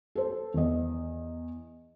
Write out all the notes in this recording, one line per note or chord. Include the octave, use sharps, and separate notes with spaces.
A4 C5
E2 D#5